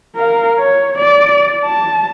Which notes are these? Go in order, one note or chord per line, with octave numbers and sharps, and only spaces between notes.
A#4 F5
C#5
D5
A5